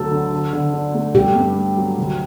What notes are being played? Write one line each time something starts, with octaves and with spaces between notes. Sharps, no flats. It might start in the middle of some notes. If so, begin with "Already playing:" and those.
Already playing: D2 F#3 A3 A4
D3
D3
D3
D4
A3
G2 G4
G2
A3
F#3
D2